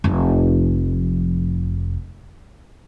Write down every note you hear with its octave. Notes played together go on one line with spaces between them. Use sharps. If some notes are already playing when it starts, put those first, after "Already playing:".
F1 F2